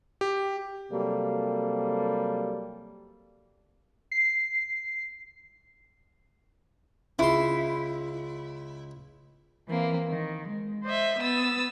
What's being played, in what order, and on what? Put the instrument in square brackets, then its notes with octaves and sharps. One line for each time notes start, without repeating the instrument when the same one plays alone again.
[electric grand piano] G4
[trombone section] C3 F#3 G3 A#3 A4
[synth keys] C7
[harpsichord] C#2 C6 [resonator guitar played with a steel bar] E4
[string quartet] E3 A#3 C4
D#3
G#3
C5 D#5 E5
B3 D#6 E6 A6